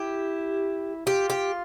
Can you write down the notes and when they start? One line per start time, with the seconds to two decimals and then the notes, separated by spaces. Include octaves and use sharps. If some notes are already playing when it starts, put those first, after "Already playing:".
Already playing: E4 G4
1.06 F4 G4
1.30 G4